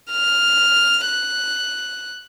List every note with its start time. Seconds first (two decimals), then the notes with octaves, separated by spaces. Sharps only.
0.11 F6
1.06 F#6